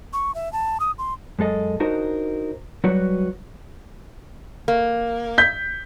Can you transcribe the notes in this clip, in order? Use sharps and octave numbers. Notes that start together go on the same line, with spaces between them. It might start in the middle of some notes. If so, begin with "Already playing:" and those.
C#6
E5
A5
D#6
C6
F#2 G#3 A4 D#5
D4 D#4 F#4 A#4 C5 D#5
F#3 G3 F#4 B4 C#5
A#3
G6 B6